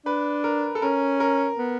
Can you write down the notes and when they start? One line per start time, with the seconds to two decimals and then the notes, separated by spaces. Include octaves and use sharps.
0.05 D4 B4
0.44 A#4
0.75 A4
0.82 C#4 A#4
1.20 A#4
1.58 B3